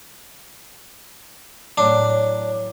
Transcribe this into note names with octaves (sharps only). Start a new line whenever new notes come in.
A2 F#3 D4 C#5